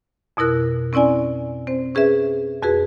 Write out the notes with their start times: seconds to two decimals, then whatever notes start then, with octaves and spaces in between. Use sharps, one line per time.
0.37 F2 B2 E4 A#4 F#6
0.93 C4 C#4 E4 D5 G#5
1.67 C4 C5
1.95 C#4 G#4 B4 E5
2.62 F2 F#4 G#4 B4